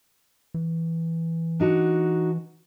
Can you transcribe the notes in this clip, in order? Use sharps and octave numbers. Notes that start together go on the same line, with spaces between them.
E3
D4 D#4 F#4